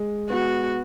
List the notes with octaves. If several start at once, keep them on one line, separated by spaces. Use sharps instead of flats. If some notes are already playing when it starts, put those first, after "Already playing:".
Already playing: G#3
B3 F#4